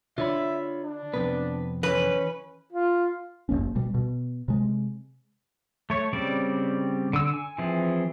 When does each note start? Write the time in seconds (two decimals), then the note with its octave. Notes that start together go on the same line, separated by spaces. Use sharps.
0.18 D3 F4 C#5 E5 B5
0.84 D4
1.14 F2 C3 B3 B4
1.83 E3 C#4 B4
2.72 F4
3.49 F#1 F#2 A#3 C#4
3.75 B2 G3
3.94 B2
4.48 C3 G#3
5.90 A3 C#5
6.13 C#3 G3 C4 D5
7.13 D3 E6
7.34 G#5
7.58 E3 F3 C4 E4 G#4